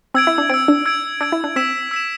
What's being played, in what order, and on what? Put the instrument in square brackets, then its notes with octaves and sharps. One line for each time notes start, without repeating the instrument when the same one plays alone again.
[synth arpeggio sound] C4 [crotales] E6 G#6 D7
[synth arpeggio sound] E4
D4
[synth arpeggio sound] C4 [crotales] E6 G#6 D7
[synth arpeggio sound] D4
[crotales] E6 G#6 D7
[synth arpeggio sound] D4 [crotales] E6 G#6 D7
[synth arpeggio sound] E4
D4
[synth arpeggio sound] C4 [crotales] E6 B6 E7
[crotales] E6 B6 E7